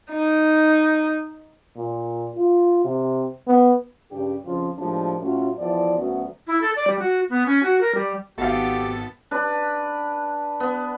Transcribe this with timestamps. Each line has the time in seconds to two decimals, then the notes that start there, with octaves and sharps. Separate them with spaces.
0.12 D#4
1.76 A#2
2.36 F4
2.84 C3
3.47 B3
4.11 G2 C#3 D4 G4
4.44 F2 C#3 F3 F4
4.78 A2 F3 G3 G#3 A#3 D4
5.21 A2 F#3 A3 C#4 F4 F#4
5.58 E2 F3 E4 D5
5.96 D2 F#3 A3 B3 C#4 F#4
6.47 E4
6.62 A4
6.76 D5
6.87 G3
6.99 F#4
7.29 B3
7.46 C#4
7.63 F#4
7.81 A#4
7.95 G3
8.38 G#1 B3 F#4 G4 A4 F5 A6
9.31 D4 B4
10.60 B3